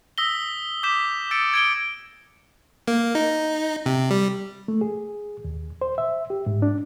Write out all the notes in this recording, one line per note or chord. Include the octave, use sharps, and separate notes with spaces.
D#6 E6 A#6 B6 G7
D6 G6 B6 E7
E6 A6 C#7 D7
G#6 D7 G7
A#3
D#4
C3
G3
A3
G#4
D#2
C5
E5
G4
G#2
D4